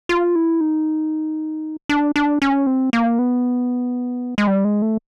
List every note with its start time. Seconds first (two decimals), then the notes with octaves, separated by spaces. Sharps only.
0.09 F4
0.36 E4
0.61 D#4
1.89 D4
2.16 D4
2.42 C#4
2.67 C4
2.93 A#3
3.19 B3
4.38 G#3
4.47 G3
4.65 G#3
4.82 A3